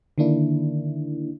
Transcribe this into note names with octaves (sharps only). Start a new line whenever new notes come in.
D3 D#3 A#3 D4 E4